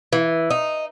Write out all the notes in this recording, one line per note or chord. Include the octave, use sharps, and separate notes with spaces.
E3
D#4